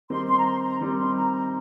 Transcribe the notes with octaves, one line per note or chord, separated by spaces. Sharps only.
D#3 G3 C4 D#4 C6
C6
A#5
C6
A#5
D#3 G3 C4 D#4
C6
A#5
A#5